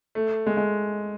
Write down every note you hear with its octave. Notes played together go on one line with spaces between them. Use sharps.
A3
G#3
G#3